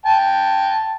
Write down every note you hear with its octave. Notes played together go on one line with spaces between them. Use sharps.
G5 A5